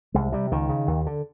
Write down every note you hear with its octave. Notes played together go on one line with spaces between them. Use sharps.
C2 G#3
C3 G3
C#2 D#3
C#3
D#2
D3